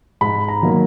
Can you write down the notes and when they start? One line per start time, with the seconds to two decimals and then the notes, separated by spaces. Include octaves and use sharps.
0.21 G#2 B5
0.48 A#5
0.62 D#3 F#3 A#3